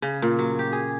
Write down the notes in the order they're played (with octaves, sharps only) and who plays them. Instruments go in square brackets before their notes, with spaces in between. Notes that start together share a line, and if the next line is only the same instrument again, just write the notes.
[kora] C#3
A#2
F#3
G4
G#4